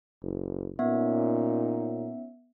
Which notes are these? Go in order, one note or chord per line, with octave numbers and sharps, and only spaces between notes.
F#1
A#2 B3 C#4 D#4 E5